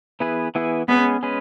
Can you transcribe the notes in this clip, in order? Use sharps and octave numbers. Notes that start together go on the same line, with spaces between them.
E3 B3 E4 G#4 B4
E3 B3 E4 G#4 B4
G#3 B3 C#4 G#4 B4
G#3 C#4 G#4 B4